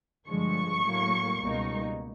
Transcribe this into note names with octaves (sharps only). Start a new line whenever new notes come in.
G2 D3 F3 G#3 C#6
A2 F#3 A#3
C#2 B2 G3 A#3 D#4